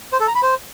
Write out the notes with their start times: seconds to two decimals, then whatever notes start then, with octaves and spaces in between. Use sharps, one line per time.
0.13 C5
0.20 A4
0.28 A#5
0.35 B5
0.43 C5